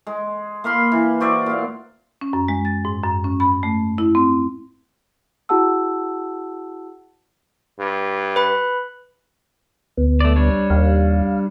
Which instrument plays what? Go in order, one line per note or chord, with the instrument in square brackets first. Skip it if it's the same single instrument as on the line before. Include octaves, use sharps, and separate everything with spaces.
[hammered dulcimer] G#3
A#3 F5 B5 C6
E3
F#4 C5 D5 E5
A#2 F5
[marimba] C#4
F#2
G#3
A6
G#2
F#2
C#4
B5
A3
E4
C4
[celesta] E4 F#4 G#4 F#5 A5 E6
[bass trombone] G2
[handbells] B4 B5
[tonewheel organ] D2 B3
[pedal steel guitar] A3 D5
G3 D4 C#5
[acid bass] D#2 [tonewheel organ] F5